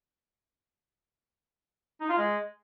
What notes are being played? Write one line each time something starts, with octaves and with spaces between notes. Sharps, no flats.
D#4
F4
G#3